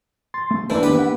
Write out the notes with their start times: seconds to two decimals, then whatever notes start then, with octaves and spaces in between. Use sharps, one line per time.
0.34 C6 A6
0.51 A3
0.70 E3 A#3 D4 E4 C5 D5 A5
0.83 D#3 B3 G4 B4
0.99 F#5